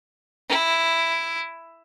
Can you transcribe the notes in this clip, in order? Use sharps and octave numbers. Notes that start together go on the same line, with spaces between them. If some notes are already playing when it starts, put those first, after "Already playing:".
E4